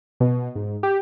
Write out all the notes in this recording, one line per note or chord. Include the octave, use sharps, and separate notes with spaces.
B2
G#2
G4